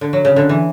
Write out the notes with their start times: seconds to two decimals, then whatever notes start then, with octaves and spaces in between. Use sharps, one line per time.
0.01 D3
0.13 F#3
0.25 C#3
0.36 D3
0.49 E3